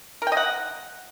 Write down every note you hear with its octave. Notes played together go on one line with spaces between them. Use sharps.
A#4
G5
D#5
F#5